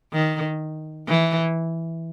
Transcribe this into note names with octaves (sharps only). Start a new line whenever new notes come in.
D#3
E3